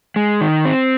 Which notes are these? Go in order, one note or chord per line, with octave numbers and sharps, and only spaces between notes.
G#3
D#3
C4